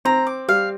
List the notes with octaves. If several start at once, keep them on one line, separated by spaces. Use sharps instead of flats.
C4 A#5
D6
G3 F5